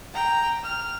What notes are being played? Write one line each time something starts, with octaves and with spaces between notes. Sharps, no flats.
G5 A#5
F6